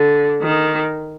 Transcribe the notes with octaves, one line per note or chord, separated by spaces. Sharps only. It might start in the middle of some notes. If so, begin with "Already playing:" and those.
Already playing: D3
D#3